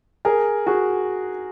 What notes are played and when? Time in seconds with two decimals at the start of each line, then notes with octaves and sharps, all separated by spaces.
0.25 G#4 A#4
0.66 F#4 G#4